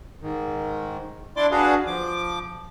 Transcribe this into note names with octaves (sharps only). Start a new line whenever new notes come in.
G#2 D#3
D4 E4 D5 C6 D6
D4 F#4 G#4 B4 F5
F3 D6